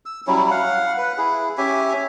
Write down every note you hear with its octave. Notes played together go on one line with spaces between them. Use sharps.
E6
F#3 G3 C#4 E4
F5 F#5
B4
E4 G#4
C#4 G4 E5 G#5